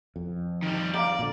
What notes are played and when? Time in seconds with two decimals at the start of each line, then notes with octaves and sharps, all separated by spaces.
0.16 F2
0.63 D#3 G3
0.94 D5 F5 A#5 D6
1.19 A#2 D3